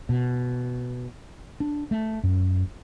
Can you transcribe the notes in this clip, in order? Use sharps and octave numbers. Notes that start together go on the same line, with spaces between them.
B2
D4
A3
F#2